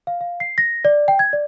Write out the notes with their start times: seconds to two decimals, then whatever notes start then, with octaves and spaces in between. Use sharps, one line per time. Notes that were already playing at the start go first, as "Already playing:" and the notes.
0.07 F5
0.21 F5
0.40 C7
0.58 A#6
0.85 D5
1.08 G5
1.19 G#6
1.33 D5